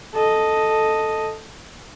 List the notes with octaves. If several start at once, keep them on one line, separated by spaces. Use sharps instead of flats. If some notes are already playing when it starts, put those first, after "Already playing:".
A4 D#5